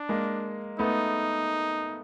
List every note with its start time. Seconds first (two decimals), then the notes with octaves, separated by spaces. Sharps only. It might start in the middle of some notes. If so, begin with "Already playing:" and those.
Already playing: D4
0.09 G#3 A#3
0.79 A3 B3 D#4